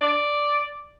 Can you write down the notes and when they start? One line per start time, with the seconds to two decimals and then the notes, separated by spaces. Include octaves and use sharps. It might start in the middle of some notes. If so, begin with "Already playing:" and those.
0.01 D5